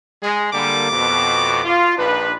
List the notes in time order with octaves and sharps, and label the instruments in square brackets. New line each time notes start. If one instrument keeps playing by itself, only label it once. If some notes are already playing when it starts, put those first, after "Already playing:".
[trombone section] G#3 [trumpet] G#4
[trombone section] D3 G3 A#3 [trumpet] D6
[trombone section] F2 B2
F4
[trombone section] A#1 D4 B4 [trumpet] D#4